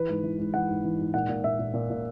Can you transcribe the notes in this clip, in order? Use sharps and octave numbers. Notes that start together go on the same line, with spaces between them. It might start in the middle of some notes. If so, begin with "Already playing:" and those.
Already playing: E3 B4
G#2
E3
G#2
E3 F#5
G#2
E3
G#2
A#2 F#5
A#2
A#2 E5
A#2
A#2
A#2